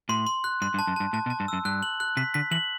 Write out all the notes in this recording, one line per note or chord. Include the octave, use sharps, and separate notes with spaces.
A2 C6
C6
F#6
G2 C6
G2
A5
F#2
G2 A5
A2 A5
B2
A5
G2
F#2 E6
G2 F#6
F#7
F#6
C3 B6
D3 B6
E3 F#7